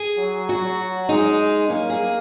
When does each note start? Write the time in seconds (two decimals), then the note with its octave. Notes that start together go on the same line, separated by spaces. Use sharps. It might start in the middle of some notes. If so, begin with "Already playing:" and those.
Already playing: G#4
0.18 F#3
0.49 F#4
1.09 G#3 D#4
1.69 A#3 C#4
1.90 G#4